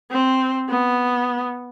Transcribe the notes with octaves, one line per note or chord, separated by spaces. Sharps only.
C4
B3